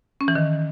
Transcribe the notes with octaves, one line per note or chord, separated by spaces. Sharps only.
C#4
E3
D#3